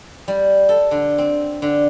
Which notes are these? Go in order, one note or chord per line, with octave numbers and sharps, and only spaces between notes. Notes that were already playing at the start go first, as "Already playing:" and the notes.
G3
A4
D3
C4
D3